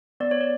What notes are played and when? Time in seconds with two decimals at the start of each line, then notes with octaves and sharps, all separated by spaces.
0.20 B3 D5
0.31 C#5
0.41 D5